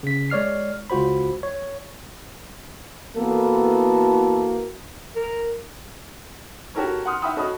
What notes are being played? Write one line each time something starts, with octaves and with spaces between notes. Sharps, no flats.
C#3 B6
G#3 C#5 D5 F6 C7
C#2 F4 F#4 C5 B5
C#5
E3 A#3 B3 F#4 A4
A#4
F#4 G4 A4 A#4 C#5
F#5 C6 D#6 F6
E5 F#5 G5 B5 D#6 E6
F#4 A4 C#5 D#5 B5 D#6